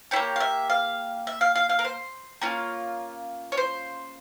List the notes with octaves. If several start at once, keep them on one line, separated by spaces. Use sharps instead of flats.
A#3 E4 G4 C#5
F5
E5
F5
E5
F5
F5
F5
A#4
C5
A#3 C#4 F4
C#5
C5